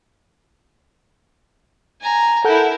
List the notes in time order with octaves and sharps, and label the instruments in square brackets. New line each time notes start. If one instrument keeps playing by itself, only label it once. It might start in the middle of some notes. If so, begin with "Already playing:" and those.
[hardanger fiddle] G#5 A#5
[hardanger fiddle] E4 A#4 [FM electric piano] A4 F#5 G6